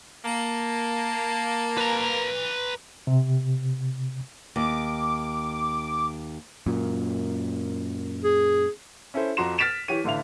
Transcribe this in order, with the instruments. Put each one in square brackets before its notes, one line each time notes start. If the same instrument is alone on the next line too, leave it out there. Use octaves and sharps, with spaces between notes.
[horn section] A#3 [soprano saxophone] A5
[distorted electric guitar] B4 A#5
[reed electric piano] C3
[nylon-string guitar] D#2 [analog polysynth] D6
[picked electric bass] F#2 A#2
[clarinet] G#4
[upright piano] C#4 E4 A4 C5
F2 F3 F#4 A#5 C6 E7
F6 A6 B6 D7 E7 F7
E3 G4 C#5 D#7
A1 D3 E4 F5 F7